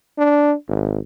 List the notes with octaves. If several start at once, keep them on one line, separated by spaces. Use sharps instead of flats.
D4
G#1